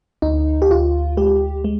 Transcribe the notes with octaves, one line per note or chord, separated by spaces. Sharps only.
D2 D#4
G4
D2 F4
G#3 G4
G#3